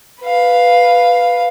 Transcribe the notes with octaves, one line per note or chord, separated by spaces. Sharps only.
B4 F5